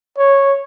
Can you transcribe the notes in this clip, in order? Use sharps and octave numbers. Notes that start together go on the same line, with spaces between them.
C#5